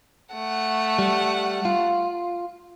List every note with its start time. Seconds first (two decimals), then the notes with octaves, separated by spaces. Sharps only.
0.35 A3 F#5
0.99 G3
1.65 F4